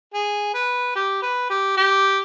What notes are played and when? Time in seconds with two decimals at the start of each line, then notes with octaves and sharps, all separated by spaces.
0.14 G#4
0.54 B4
0.96 G4
1.22 B4
1.49 G4
1.77 G4